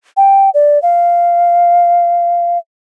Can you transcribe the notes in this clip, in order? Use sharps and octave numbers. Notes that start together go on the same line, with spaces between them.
G5
D5
F5